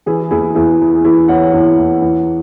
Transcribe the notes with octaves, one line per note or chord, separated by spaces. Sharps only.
E3 E4 G#4
E2 E4 G#4
E2 E4 G#4
E3
E3 E4 G#4
E2 C#5 F#5
E2
E2
E2